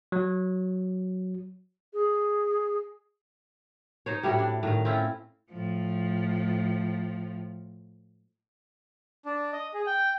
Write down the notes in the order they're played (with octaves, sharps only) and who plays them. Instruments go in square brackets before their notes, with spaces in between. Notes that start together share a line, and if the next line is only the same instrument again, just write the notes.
[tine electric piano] F#3
[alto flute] G#4
[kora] D#4 C5 C#5
A2 G3 E4 F#4
D4
A2 D#3 F5
C4 C#4 E4 F4
[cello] A2 F3
[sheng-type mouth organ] D4
D#5
G#4
G5